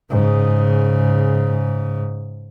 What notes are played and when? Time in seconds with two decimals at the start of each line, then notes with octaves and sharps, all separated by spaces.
0.10 G#2 C#3